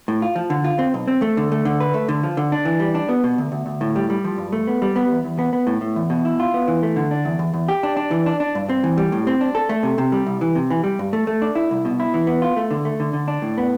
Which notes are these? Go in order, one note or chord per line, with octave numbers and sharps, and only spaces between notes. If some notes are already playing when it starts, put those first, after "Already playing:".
A2
F4
F3
D3
F4
C4
B1
C4
A3
D3
A3
D3
B4
A3
D3
F3
D3
D4
E3
G3
D4
B3
B2
D2
D2
D2
A2
G3
G3
F3
G2
A3
B3
G3
B3
E2
E2
B3
B3
A2
A2
E2
B2
E4
F4
B3
E3
A3
D3
D4
E2
E2
E2
G4
D4
D4
E3
D4
D4
G2
C4
E3
G3
A2
C4
D4
A4
A3
C3
C3
G3
C2
E3
C3
E3
G3
G2
A3
A3
D4
E4
C2
B2
E4
E3
B3
F4
A3
D3
A3
D3
D3
D4
A2
B3